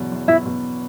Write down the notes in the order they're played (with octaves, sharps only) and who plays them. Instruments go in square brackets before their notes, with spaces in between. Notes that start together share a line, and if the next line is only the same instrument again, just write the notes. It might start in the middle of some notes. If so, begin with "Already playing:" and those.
Already playing: [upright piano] E2 B2 F#3
E2
[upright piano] B2 [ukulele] E4
[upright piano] B2